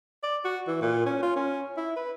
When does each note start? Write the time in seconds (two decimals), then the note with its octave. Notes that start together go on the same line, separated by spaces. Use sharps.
0.23 D5
0.45 F#4
0.68 E3
0.81 A#2
1.06 C#4
1.23 F4
1.36 C#4
1.77 E4
1.96 B4